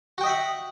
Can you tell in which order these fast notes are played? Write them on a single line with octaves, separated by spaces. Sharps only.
F#4 G5 D#5 E5 F#5